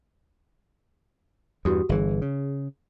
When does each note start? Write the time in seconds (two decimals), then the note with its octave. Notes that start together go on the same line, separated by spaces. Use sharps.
1.65 E2 G2 F#4 G4 D#6
1.89 G1 E3 G#4
2.22 C#3